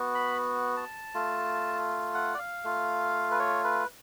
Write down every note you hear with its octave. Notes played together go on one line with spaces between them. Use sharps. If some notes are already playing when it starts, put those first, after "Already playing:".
Already playing: B3 F#4
B5
A5
A3 F4
F#5
D5
F5
A3 F4
B4
C#5
B4